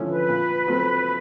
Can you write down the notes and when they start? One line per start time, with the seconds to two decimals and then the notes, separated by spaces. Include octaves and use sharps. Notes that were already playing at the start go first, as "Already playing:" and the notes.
Already playing: D3 F3 A3 C#4 E4
0.09 B4
0.29 A#2
0.66 F#3 A3 C4